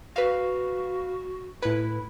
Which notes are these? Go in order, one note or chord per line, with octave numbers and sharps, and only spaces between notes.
F#4 B4 F5
A2 E4 B4